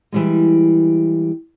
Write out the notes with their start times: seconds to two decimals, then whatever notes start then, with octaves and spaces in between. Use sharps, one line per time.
0.12 E3 G3 G#3